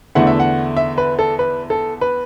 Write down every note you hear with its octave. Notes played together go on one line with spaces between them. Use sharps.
E2 D3 A3 E4 F#5
E5
F#5
E5
B4
A4
B4
A4
B4